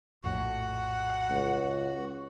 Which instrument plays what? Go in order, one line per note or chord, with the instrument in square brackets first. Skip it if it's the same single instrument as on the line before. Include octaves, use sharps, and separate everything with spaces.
[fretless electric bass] A#1 F2 A2 [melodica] F#4 [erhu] F#5
[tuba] C#2